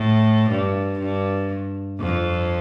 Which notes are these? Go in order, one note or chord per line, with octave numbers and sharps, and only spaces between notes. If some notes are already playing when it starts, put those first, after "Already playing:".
Already playing: A2
G2
G2
F2